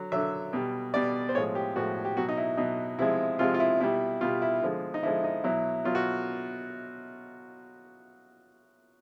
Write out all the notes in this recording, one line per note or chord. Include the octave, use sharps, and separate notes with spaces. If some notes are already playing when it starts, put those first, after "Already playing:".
Already playing: D3 F#3
D3 F#3 E5
B2 G3
B2 G3 D5
C5
A2 F3 G#3 C#5
G4
A2 F3 G#3 F#4
G4
B2 F#3 F#4
D#4
E4
B2 F#3 D#4
C3 F3 G#3 E4
C3 F3 G#3 F4
F4
E4
B2 G3 E4
B2 G3 F4
E4
D3 F3 G#3
D#4
D3 F3 G#3 E4
D#4
B2 F#3 E4
B2 F#3 F4
F#4